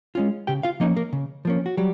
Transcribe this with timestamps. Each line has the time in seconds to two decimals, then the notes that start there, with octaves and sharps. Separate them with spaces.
0.15 G#3 C#4 F4
0.47 C#3 G4 G5
0.63 F4 F5
0.80 F3 A#3 C#4 D#4 D#5
0.96 A#3 A#4
1.13 C#3
1.45 F3 A#3 C#4
1.66 F#4
1.77 F#3 G3 G4